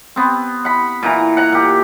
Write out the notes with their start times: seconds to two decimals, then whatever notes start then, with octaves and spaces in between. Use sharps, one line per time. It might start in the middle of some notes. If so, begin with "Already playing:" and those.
0.16 B3 C4
0.65 F#5 B5
1.03 A#2 E3 A#5
1.37 F#5 A#5
1.52 A#2 G4